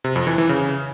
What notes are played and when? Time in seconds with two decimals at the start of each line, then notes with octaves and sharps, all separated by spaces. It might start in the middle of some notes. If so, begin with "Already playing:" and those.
0.04 C3
0.16 F2
0.27 E3
0.38 E3
0.49 C#3